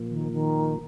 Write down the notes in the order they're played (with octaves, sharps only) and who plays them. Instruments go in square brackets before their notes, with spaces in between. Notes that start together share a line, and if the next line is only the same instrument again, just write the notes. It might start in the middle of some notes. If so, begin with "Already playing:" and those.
Already playing: [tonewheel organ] A#2 F3 A#3
[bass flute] D#3
D#3